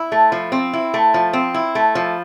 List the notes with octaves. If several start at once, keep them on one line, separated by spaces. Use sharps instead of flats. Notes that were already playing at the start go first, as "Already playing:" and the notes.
Already playing: E4
A3
F3
C4
E4
A3
F3
C4
E4
A3
F3